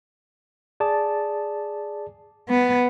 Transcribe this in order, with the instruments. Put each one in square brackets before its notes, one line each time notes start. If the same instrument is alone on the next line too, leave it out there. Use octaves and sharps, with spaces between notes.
[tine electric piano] G#4 D5 A5
[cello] B3